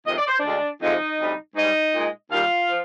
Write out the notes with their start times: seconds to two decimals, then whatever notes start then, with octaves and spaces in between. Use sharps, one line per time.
0.06 F2 C3 D#3 G#3 D#5
0.17 D5
0.27 C5
0.38 D4 D5
0.44 D2 D3 G#3
0.81 F2 C3 F3 G#3 D#4 D#5
1.19 D2 C3 G3
1.56 G#2 G3 D#4 D#5
1.94 A#2 G#3
2.31 D#2 D#3 G3 F4 F5
2.69 F3